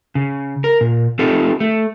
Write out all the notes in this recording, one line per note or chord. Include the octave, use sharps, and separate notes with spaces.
C#3
A#4
A#2
A3 C4 D#4 F4 G4 A4
A3